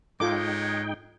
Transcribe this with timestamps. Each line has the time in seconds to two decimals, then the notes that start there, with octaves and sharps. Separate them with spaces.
0.20 G#2 G#3 D#4 F4 A4 C#5 G5 D6